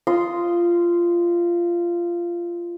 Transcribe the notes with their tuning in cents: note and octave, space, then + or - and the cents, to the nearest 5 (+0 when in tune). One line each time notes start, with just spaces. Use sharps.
F4 -15 D#5 +0 C6 +0